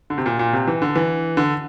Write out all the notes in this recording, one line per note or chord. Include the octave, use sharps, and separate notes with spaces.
D3
C3
A#2
A#2
C3
E3
D3
E3
D3